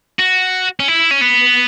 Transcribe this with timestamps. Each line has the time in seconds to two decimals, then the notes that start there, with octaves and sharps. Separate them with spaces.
0.19 F#4
0.80 C#4
0.88 E4
1.11 C#4
1.22 B3